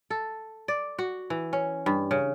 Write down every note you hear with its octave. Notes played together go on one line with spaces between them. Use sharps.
A4
D5
F#4
E3
C#4
G2
C#3